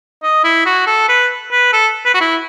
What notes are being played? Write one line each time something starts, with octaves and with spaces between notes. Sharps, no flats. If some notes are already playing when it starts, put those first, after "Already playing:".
D#5
E4
F#4
A4
B4
B4
A4
B4
F#4
E4